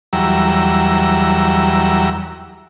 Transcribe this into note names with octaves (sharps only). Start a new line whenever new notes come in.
E2 F#3 G3 A#5 E6